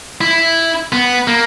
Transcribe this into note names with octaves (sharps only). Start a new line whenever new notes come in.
E4
B3
A#3